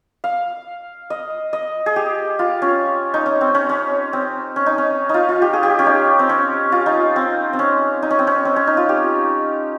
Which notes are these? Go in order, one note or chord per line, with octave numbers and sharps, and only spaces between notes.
F5
D#5
D#5
G#4
G4
F4
C#4
D#4
C#4
C4
C#4
C#4
C4
C#4
D#4
C#4
D#4 F4
F4
G4
G#4
G4
C#4
D#4
C4
C#4
F4
D#4
C4
C4
C#4
D#4
C#4
C4
C#4
C4
C#4
D#4
F4
G4